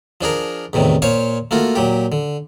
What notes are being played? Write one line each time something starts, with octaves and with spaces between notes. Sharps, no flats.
F3 D4 G#4 A#4
E2 A2 C3 D#3
A#2 C5 C#5 F5 C6 C#6
A3 A#3 F4 F#4
A#2 F#3 G4
D3